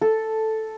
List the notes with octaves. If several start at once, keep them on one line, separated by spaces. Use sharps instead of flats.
A4